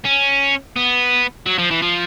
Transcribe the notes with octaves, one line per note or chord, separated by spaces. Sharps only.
C#4
B3
F#3
F3
E3
F3